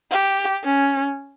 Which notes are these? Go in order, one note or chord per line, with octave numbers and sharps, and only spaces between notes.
G4
C#4